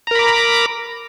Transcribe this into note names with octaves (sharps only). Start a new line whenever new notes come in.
A#4 A#5 B5 D6